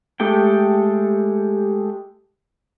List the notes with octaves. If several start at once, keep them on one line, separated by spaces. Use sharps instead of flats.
G#3 A3 G4 A4 G5